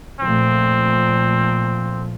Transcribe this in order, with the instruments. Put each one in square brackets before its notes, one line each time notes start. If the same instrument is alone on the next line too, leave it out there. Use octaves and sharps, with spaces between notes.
[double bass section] A#2 F3 A3 [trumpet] C4